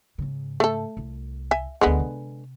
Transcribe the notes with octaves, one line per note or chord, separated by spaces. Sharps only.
G#2 C#3
A3 A4
C2
E5 G#5
G1 D2 D3 G#3 B3
C3